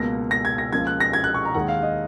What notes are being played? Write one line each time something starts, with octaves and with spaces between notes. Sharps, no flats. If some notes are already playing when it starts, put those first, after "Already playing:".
Already playing: C#2 B2 A#3 A#6
A#6
G#6
A#6
C#2 C#3 F3 A#3 G#6
F#6
A#6
G#6
F#6
C#6
A#5
D#2 D#3 G#3 F#5
F5
D#5